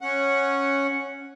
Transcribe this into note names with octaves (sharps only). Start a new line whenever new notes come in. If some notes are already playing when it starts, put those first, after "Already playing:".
C#4 F#5